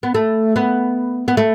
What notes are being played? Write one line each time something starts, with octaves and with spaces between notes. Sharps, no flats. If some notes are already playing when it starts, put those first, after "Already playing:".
B3
A3
B3
B3
A3